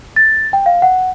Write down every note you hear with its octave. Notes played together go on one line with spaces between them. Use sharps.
A6
G5
F5
F#5